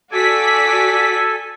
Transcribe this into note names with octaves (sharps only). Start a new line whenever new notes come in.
F#4 A4 D5 G#5 B6